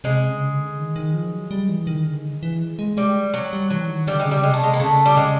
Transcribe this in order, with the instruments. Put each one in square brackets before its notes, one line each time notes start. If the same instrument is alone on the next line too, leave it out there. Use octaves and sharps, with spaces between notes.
[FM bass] C3 [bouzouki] G#3
[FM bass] C#3
D3
D#3
D#3
F3
F#3
G3
E3
D#3
D3
E3
G#3
[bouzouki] G3 [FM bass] G#3
[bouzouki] F#3
[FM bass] G3
[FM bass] E3 [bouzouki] F#3
[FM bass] D#3
[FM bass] D3 [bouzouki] G3
[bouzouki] G#3
[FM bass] C#3
[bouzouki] G3
[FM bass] C3 [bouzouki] G#3
[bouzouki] A3
G#3
A#3
[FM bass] C#3 [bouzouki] A3
[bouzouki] G3
[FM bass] C#3 [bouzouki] G#3